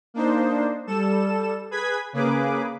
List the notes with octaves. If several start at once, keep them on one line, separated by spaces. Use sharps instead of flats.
A#3 D4 D#4 C5
G3 A4 E7
G#4 B4 G#6 B6
C#3 A#3 G#4 B4 D6